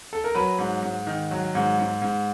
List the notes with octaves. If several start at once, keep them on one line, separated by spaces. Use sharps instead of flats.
A4
A#4
F#3 B4
G#2
G#2
D#3
F#3
G#2
G#2
G#2